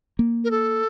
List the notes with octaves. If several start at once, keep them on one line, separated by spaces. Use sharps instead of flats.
A#3
A#4
A4